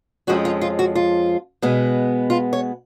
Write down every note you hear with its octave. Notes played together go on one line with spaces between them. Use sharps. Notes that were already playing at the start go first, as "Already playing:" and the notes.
F2 F3 G#3 C#4 F#4
F4
F4
F#4
F4
B2 G#3 B3
F4
C#5